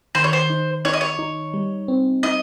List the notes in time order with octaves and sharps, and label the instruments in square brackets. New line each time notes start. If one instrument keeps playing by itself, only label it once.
[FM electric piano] D#3 [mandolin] C5
[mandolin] C#5
C5
[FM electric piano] D#4
[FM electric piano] D#4 [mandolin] C#5
[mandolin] D#5
C#5
[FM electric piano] D#4
G3
C4
[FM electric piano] D#4 [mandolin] D#5